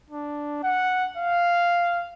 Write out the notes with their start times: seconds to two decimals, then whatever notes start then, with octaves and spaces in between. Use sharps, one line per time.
0.11 D4
0.63 F#5
1.17 F5